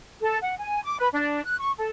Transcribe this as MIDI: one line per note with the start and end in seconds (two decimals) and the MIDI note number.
0.21 0.38 69
0.43 0.53 78
0.59 0.81 80
0.83 0.96 86
0.99 1.08 71
1.13 1.43 62
1.44 1.56 90
1.59 1.71 85
1.77 1.89 69